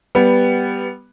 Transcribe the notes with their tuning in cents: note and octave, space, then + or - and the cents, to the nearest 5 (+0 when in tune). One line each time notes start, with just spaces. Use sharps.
G3 +5 B3 +0